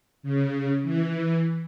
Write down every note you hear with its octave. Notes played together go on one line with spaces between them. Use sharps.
C#3
E3